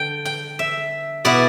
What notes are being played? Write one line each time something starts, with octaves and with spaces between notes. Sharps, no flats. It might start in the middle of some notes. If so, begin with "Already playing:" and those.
Already playing: D3 G5
G5
E5
B2 B3 E4 D5